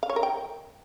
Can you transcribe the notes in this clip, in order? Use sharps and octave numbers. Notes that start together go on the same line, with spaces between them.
F5
C#5
A#4
G5